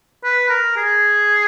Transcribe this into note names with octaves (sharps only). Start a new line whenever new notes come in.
B4
A#4
G#4